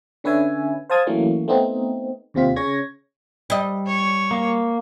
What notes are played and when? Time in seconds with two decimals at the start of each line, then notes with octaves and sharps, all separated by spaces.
0.24 D3 C#4 B4 E5 G#5
0.90 C5 F5 A5 D#6 G#6
1.07 E3 F#3 A3 A#3 C#4
1.48 A3 B3 C4 D#4
2.34 D#2 C3 C4 F4 B6
2.56 C#3 C#4 C#5 C#6 G#6 A#6
3.50 G3 D#5
3.87 C#5
4.31 A#3